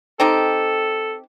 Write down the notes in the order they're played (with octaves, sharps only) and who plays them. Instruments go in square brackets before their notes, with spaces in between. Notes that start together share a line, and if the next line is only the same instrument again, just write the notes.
[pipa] C4 D#4 G4 [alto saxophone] A4